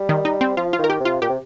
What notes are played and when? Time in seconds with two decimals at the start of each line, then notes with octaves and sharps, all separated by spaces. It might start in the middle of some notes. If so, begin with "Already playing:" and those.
Already playing: G3
0.09 D#3
0.25 D#4
0.41 C4
0.57 F3 F4
0.73 F4
0.79 D#3
0.84 A#4
0.90 G4
1.00 C3
1.05 F4
1.22 A#2 G4
1.29 C3